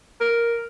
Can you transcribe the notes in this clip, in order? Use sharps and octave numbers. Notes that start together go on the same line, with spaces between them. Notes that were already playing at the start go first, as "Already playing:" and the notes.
A#4